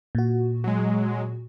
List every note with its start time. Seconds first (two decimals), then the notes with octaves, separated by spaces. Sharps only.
0.15 A#2 F#4
0.64 F#3 G#3